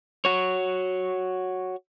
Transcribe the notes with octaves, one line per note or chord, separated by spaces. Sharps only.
F#4 C#5